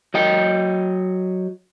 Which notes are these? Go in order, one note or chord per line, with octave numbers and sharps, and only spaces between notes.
F#3 D#5 G5